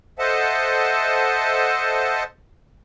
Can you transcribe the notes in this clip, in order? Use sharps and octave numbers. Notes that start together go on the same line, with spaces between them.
A4 C5 D#5 E5 F#5 A5